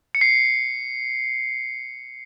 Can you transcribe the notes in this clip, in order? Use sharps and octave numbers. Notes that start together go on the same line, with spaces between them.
C#7
C7